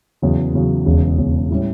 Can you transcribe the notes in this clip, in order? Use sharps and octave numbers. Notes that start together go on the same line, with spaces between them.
E2 C#3 F#3
E2 C#3 F#3
E1 E2 C#3
E1 E2 C#3
A2 G3 C#4